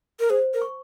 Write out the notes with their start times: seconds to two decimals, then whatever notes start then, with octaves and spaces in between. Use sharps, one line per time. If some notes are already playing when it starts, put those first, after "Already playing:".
0.20 A#4
0.30 G#4 C5
0.54 A#4
0.61 C#6